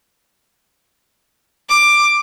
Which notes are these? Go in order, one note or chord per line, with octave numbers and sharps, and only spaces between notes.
D6